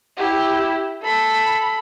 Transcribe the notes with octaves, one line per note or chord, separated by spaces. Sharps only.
E4 G4
A4 B5